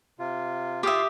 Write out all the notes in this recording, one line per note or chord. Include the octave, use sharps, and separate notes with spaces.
C3 F4
F4 G4 E5 F5 C6 D6 D#6